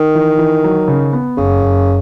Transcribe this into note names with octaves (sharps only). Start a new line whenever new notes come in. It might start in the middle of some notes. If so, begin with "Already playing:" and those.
Already playing: D#3
E3
E3
F#3
C#3
B3
F#1 C#3
F#1